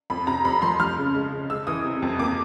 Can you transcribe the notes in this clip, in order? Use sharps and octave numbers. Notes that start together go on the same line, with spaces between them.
F2 B5
C3 A#5
F2 B5
F3 C6
F3 F6
C#3
G#3
C#3
G#3 E6
E3 D#6
C3
F2
A#3 D6